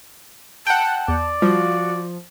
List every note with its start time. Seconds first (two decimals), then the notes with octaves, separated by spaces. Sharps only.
0.67 F#5 G5 A5
1.08 E2 D5
1.42 F3 G3 F#4